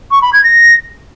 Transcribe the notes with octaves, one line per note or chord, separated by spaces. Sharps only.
C#6
B5
G#6
A#6